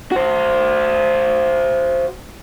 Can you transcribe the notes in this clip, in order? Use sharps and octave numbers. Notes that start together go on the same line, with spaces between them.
F#4 C5